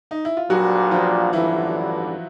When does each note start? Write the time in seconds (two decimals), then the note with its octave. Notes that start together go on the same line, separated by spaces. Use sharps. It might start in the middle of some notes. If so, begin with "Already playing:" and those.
0.11 D#4
0.25 E4
0.37 F4
0.50 A#1 A#2 F#3 G3 B3 D4 F#4
0.91 F3 F4
1.33 A1 G2 D3 E3 G3 B3 E4